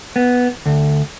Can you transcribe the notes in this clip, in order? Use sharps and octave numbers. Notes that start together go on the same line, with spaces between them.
B3
D2